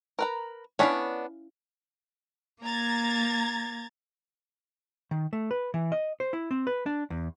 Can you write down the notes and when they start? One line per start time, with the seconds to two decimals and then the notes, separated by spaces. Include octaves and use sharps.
0.19 A#4 B4 A#5
0.79 B3 C#4 D4 E4 C#5 F5
2.62 A#3 A#5 G#6 A6
5.11 D#3
5.33 A3
5.51 B4
5.74 E3
5.92 D#5
6.20 C5
6.33 E4
6.51 C4
6.67 B4
6.86 D4
7.10 E2